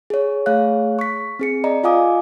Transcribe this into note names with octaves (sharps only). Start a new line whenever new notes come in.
G#4 C#5
A3 G#4 C#5 F5 F#6
C#6 B6
C4 G#4 C#7
D5 D#5 A#5
F4 D#5 F5 G#5 D6 D#6